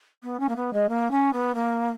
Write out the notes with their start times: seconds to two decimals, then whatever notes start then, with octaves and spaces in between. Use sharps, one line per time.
0.23 B3
0.39 C#4
0.48 A#3
0.56 B3
0.73 G#3
0.89 A#3
1.11 C#4
1.33 B3
1.54 A#3